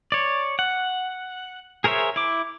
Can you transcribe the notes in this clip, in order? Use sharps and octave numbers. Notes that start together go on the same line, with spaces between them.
C#5 D5
F#5
G#4 A#4 C5 C#5 E5
E4 D6